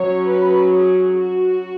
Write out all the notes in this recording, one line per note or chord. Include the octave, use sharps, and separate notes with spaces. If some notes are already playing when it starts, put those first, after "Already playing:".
Already playing: F#3 C#4 C#5
B4
G#4
F#4